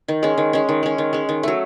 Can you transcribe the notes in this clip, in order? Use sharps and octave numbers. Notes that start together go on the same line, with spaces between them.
D#3
G#3 C#4
D#3
G#3 C#4
D#3
G#3 C#4
D#3
G#3 C#4
D#3
F#3 A3